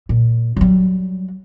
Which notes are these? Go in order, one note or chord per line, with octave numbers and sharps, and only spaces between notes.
A#2
F#3 G3